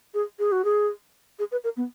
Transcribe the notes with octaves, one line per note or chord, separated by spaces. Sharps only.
G#4
G#4
F#4
G#4
G#4
B4
A#4
B3